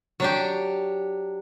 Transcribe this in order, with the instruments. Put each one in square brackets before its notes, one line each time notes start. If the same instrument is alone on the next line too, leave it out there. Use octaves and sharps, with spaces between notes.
[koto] F#3 D4 G4